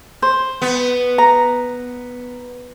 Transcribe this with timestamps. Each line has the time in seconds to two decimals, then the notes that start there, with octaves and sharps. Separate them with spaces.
0.22 C5
0.62 B3
1.18 A#5